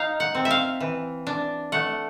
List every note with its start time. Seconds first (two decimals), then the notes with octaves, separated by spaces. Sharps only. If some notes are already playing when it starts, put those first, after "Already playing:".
Already playing: D#4 F5
0.20 F#5
0.35 C4
0.45 E5
0.51 F5
0.80 E3
1.27 D4
1.72 A3 F#5